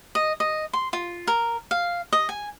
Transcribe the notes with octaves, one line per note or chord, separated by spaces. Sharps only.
D#5
D#5
C6
F4
A#4
F5
D#5
G#5